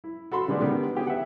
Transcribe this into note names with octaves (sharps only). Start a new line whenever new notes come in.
E4
F#4 A4 B5 C6
D3 D#3 G3 G#3 B3 D4
D3 D#3 G3 B3
B3 G4 G#4
E5 F#5